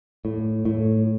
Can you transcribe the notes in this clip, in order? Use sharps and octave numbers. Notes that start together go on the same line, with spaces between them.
A2
A2